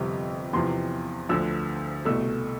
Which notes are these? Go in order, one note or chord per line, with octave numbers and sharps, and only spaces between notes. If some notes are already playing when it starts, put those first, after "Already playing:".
Already playing: G1 F2 C3 G3
E2 C3 F3 C6
D2 D3 F3 E6
C2 B2 A3 E6